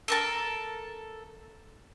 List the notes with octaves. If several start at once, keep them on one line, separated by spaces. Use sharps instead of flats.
A4 A#4 A5